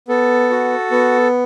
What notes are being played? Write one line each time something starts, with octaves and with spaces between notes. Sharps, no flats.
B3 A4
F#4
B3